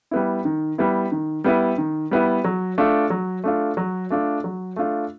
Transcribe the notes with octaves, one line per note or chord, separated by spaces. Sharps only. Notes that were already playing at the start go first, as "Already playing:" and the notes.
G3 B3 E4
D#3
G3 B3 E4
D#3
G3 B3 E4
D#3
G3 B3 E4
F#3
A3 D4 F4
F#3
A3 D4 F4
F#3
A3 D4 F4
F#3
A3 D4 F4